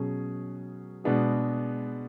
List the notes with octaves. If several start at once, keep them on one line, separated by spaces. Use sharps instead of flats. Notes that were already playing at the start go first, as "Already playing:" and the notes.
Already playing: B2 F#3 C#4 G#4
B2 G#3 B3 D4 G#4